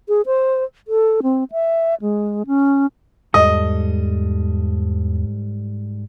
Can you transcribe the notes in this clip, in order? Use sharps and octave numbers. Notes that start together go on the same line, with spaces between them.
G#4
C5
A4
C4
E5
G#3
C#4
E2 G#2 G3 A4 D#5